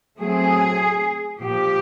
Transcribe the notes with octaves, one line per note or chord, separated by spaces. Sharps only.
F#3 A3 C4 G#4
A#2 F3 A#3 G4